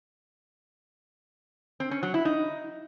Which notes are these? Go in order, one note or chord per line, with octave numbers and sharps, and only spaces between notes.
C4
C#4
F#3
E4
D#4